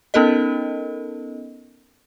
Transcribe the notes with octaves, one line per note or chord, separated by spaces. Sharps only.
B3 C#4 D#4 A4 A#4 D#5